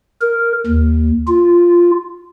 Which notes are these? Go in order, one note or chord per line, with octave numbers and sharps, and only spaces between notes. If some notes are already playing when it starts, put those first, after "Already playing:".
A#4
D#2
F4